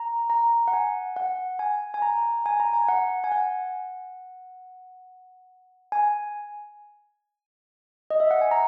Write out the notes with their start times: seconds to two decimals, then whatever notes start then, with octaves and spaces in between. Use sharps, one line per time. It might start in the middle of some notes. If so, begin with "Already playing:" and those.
Already playing: A#5
0.30 A#5
0.68 F#5
0.73 G#5
1.16 F#5
1.59 G#5
1.94 G#5
2.02 A#5
2.46 G#5
2.60 A#5
2.74 G#5
2.89 F#5
3.24 G#5
3.32 F#5
5.92 G#5
8.11 D#5
8.20 E5
8.31 F#5
8.41 G#5
8.51 A#5